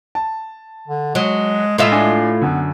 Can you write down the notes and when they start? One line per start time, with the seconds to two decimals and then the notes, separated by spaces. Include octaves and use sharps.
0.15 A5
0.88 D3
1.15 F#3 G#3
1.78 A2 G#3 F4 E5
1.92 D4 G#5
2.42 F#2 D3 B3